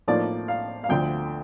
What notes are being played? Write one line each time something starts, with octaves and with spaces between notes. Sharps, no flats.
A2 F3 A#3 D#4 D5
F5
F5
D2 D3 F3 G5